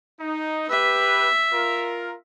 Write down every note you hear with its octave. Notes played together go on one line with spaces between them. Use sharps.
D#4
G4 B4 E5
F4 A#4